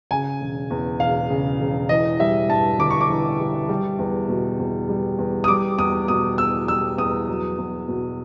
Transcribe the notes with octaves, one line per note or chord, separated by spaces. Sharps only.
C#3 G#5
E1
E2
E1 F5
C#3
E1
E3 D#5
G3 E5
G2 A5
G1 D6
C#6
D6
E3
G3
G3
E2
B2
E2
G3
E2
D#6
G3 D6
E2 D#6
B2 D#6
E2 E6
G3 E6
E2 D#6
F#3
E2
B2